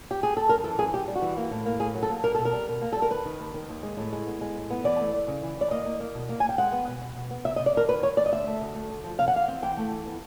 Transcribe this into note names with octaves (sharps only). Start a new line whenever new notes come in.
G4
G#4
A4
F#2 A#4
E3 A4
F#2 G#4
F#2 G4
G3
F#4
E3
A#3
A2
A#3
A2 G#4
F#3
A4
A#3
G3 A#4
B2 A4
A#4
G3
B2
A#3
A4
G3
A#4
D#3 B4
D#3
D#2
D#3
D#2
G#3
A2
G#3
B3
G#3
A2
B3
E3 D5
A3
A3
C#3
E3
E3 D5
A#3 D#5
A#3
A#3
B2
A#3
A#3 G#5
G5
G#3 F#5
B3
B2
B2
B2
B3
C3 E5
D#5
C3
D5
E2 A#4
D#3 B4
E2 C#5
E2 D5
D#5
D2 E5
A3
D2
A3
D2
F3
C3 F5
F#5
E3 F5
C4
E3 G5
A3
E3
B3